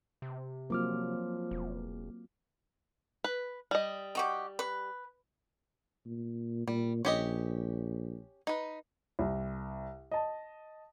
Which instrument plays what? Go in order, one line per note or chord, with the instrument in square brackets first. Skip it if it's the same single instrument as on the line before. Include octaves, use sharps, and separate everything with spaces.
[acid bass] C3
[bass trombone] F3 [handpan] F#3 C4 F4 [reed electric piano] A#3 D6 F6
[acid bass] E1
[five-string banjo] B4
G3 D#5
[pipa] D#4 F#4 G4
B4
[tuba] A#2
[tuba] A#2 [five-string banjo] G3
[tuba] A#1 [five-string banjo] C#4 G4 D#5
[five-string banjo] D#4 B4
[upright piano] C2
D#5 A5